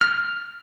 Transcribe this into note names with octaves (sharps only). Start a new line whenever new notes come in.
F6